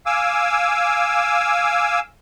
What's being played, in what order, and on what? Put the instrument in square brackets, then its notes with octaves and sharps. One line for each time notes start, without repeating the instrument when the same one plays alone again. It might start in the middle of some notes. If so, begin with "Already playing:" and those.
[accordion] F5 G#5 D6 E6